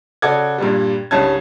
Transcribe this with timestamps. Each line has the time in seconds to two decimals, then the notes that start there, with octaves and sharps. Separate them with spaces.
0.22 C#3 F#4 A4 D5 G#6
0.58 G2 A#2 G3
1.11 C2 G2 C#3 C#4 A5 G#6